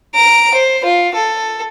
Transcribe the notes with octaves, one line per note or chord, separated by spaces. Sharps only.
A#5 D7
C5
F4
A4